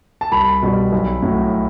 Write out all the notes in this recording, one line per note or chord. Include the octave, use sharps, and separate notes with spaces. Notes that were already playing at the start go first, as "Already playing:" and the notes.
A5
C2 B5
B2 G3
B1
A2 F#3